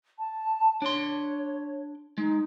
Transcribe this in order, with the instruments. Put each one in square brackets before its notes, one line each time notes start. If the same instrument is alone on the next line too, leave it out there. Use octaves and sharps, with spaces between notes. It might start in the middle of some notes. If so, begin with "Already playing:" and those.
[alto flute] A5
[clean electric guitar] D4 C6 [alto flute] C#5
[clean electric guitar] G#3 [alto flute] D#4